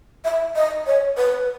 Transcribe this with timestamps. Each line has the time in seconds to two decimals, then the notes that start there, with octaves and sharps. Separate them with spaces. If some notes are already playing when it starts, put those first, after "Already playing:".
0.25 E5
0.56 D#5
0.87 C#5
1.17 B4